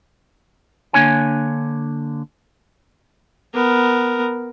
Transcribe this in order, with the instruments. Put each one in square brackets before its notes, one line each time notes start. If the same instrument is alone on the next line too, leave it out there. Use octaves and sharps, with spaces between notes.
[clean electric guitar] D3 A#3 D4 F4 C#5 G#5
[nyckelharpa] B3 A#4